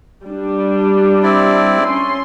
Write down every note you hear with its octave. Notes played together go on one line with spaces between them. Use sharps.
G3 D4
C4 E4 D5
C#4 C6